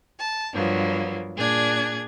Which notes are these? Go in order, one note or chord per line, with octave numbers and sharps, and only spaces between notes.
A5
G2 F3 F#3 A#3 B3
A#2 D4 G#4 G#6